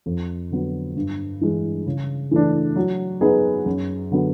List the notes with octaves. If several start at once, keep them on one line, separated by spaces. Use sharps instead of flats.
F2
D3 F#3 B3
G2
E3 G#3
C#3
E3 A3 D4
F#3
B3 D#4 G#4 B4
F#2
D3 F#3 B3